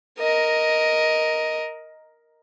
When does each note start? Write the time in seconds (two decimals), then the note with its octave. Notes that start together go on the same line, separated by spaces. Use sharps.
0.19 A#4 D#5